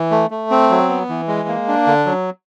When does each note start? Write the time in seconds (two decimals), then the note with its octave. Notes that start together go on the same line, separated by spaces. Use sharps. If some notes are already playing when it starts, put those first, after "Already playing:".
Already playing: E3
0.11 A3
0.31 A3
0.51 C4
0.71 F#3
0.89 B3
1.09 E3
1.28 G#3
1.48 A#3
1.68 D4
1.87 D3
2.06 F#3